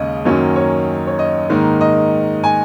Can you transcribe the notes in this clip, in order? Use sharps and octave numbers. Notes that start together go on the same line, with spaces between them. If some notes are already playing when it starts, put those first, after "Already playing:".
Already playing: D#2 C#3 G#3 D#5
F#2 D#3 F#3 A#3 C#4
C#5
C#5
D#5
G#2 D#3 A#3 D#4
D#5
G#5